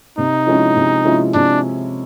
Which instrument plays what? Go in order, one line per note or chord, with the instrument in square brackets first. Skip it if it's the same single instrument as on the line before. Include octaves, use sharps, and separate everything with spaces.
[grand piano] C3 [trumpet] D#4
[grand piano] F3 G#3 C#4 E4
C3
F3 G#3 C#4 E4
[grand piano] C3 [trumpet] D4